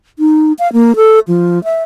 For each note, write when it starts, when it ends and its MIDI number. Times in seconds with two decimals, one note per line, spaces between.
0.19 0.52 63
0.59 0.72 77
0.73 0.96 58
0.96 1.19 69
1.28 1.62 53
1.64 1.83 76